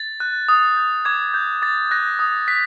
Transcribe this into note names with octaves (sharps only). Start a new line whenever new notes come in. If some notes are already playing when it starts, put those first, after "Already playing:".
Already playing: A6
F#6
D#6
G6
D6 G#6
G6
D6 A6
F#6 A#6
D#6
F#6 B6